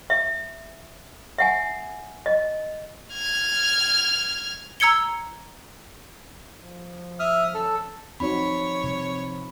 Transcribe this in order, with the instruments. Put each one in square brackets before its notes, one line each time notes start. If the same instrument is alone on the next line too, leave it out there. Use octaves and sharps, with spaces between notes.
[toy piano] E5
E5 F#5 G#5
D#5
[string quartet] F6 G#6
[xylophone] A#5 E6 G#6 C#7 G7
[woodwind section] F3
[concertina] E5 D#6 F6
[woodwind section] C#4 A5 [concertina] A4
[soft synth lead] F3 [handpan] C4 D#4 F#4 [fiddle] C#5 [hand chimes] B5
[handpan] C3 G3